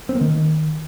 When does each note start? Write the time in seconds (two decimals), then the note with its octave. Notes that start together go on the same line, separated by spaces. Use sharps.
0.09 C4
0.15 A#3
0.21 D#3